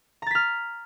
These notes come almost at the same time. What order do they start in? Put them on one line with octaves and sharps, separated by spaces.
A#5 A6 B6 F6